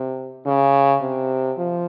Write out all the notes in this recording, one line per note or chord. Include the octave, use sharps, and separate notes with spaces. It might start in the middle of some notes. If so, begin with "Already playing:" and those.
Already playing: C3
C#3
C3
F3